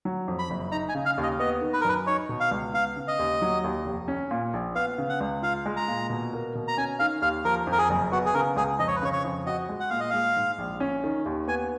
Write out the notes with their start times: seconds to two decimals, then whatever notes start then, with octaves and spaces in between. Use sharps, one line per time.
0.05 F#3
0.28 F2
0.39 B5
0.50 F#1
0.72 D#4 A#5
0.89 G#5
0.95 C#3
1.06 F5
1.18 D#2
1.23 D#5
1.39 B3 D#5
1.61 D#3
1.73 B4
1.81 A#4
1.84 F#2 B4
2.06 D#4 C#5
2.29 B2
2.40 F5
2.51 C#2
2.73 B3 F5
2.96 C#3
3.08 D#5
3.19 D#2
3.42 F#3
3.64 D#2
3.85 F1
4.08 C#4
4.31 A#2
4.53 A#1
4.75 B3 F5
4.98 C#3
5.09 F#5
5.21 C#2
5.42 F4 F5
5.66 G#3
5.76 A#5
5.88 A#2
6.10 B2
6.33 A#3
6.55 B2
6.68 A#5
6.78 C#4 G#5
6.99 D#3 F5
7.22 D#2 F5
7.45 F3 A#4
7.67 F2 A#4
7.78 G#4
7.90 F#1
8.12 B3 F#4
8.26 G#4
8.34 C#3 A#4
8.56 C#2 G#4
8.79 F2 D#5
8.88 C#5
8.96 B4
9.02 C#3 C#5
9.13 C#5
9.25 F2
9.46 F#4 D#5
9.69 G#3
9.80 F#5
9.90 A#2 F5
10.00 D#5
10.10 G#3 F5
10.36 G#2
10.58 A#1
10.80 C#4
11.04 D#3
11.26 D#2
11.48 B3 G#5